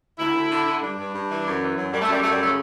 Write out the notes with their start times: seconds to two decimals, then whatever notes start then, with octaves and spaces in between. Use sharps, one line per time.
0.19 D2 E4
0.34 D2
0.51 D3
0.66 D3
0.82 G2 D4
0.97 G2
1.13 G2
1.30 E3
1.45 F#2
1.61 E3
1.77 F#2 F#3
1.92 F#2 G3
2.02 A3
2.08 F#2 G3
2.22 F#2 A3
2.32 G3
2.40 C#3 A3